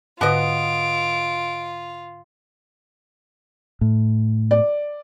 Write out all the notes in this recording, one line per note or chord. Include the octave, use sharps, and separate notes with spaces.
G#2 D3 B3 F4 B4 D#5 D7
A2
D5